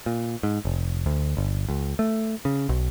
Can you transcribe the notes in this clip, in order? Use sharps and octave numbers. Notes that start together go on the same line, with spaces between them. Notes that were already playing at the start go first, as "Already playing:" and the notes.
A#2
G#2
F1
D2
G1
C#2
A3
C#3
B1